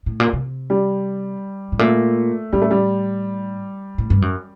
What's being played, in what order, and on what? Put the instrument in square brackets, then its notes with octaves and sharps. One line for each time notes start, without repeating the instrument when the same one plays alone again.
[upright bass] A2
A#2
C3
[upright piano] G3
[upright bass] A2
[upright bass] A#2 [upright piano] A3
[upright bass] A2 [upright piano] G3
[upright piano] A3
G3
[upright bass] A2
G2
F#2